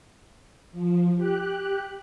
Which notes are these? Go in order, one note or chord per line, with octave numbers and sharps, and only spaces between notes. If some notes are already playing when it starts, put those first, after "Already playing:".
F3
G4 F#6